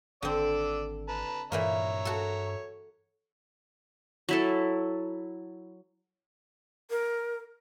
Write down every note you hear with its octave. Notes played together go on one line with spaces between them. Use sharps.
G#1 D3 C4 D5 D6 E6
B4 A5 A#5
G2 A#2 E3 A#3 C#5 E5 A#5
F#4 A4
F#3 E4 A4
A#4